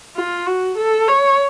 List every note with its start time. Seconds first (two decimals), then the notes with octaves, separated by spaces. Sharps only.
0.16 F4
0.46 F#4
0.77 A4
1.08 C#5